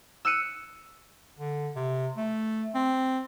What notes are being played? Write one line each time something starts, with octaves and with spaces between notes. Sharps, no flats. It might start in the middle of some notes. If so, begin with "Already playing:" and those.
E6 F#6 C#7 D#7
D3
C3
A3
C4